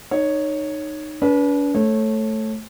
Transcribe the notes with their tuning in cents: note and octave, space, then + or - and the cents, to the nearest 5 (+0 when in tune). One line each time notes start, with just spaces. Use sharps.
D#4 -20 C#5 +0
D4 -45 B4 -20
A3 +0 C#5 -25